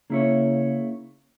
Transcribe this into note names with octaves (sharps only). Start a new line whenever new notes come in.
C#3 A#3 E4 C#5